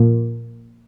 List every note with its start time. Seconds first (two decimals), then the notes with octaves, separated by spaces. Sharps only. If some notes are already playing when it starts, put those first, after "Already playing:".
Already playing: A#2 F3 A#3